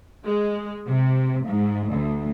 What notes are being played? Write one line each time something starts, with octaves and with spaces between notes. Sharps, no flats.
G#3
C3
G#2
D2